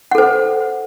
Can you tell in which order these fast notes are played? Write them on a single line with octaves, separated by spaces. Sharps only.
F#5 A4 C5